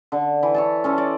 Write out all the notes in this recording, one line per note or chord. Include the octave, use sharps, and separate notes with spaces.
D3
E3
C#5 E5 A5
C#4 A4 C5
D5